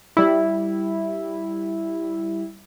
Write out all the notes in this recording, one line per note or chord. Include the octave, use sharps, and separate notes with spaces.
G3 E4